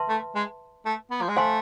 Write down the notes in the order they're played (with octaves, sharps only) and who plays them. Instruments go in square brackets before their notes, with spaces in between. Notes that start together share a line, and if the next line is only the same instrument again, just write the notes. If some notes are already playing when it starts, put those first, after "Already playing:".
Already playing: [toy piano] B4 E5 A5 C6
[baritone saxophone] A3
G#3
A3
B3
F3
G#3
[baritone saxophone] A3 [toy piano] C5 F5 G#5 C6